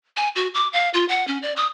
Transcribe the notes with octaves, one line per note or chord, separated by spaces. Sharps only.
G#5
F#4
D6
F5
F4
F#5
C#4
D5
D#6